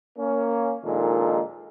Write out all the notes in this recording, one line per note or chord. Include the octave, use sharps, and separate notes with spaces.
A#3 C#4
A#1 A#2 D#3 G#3 D#4 A4